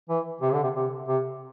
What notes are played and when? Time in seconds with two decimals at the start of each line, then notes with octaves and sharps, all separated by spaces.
0.09 E3
0.41 C3
0.53 D3
0.63 C3
0.75 C3
1.08 C3